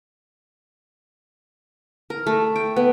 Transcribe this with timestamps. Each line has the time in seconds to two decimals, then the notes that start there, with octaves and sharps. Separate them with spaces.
2.10 A#4
2.27 A3
2.56 G5
2.76 B3